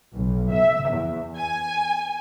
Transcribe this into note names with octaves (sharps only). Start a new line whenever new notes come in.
B1
E5
E2
G#5